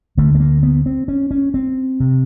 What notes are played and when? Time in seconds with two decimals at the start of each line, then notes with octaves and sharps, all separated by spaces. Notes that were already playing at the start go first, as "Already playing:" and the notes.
0.17 D2 D3 A3
0.35 A3
0.40 A#3
0.63 B3
0.86 C4
1.08 C#4
1.31 C#4
1.54 C4
2.00 C3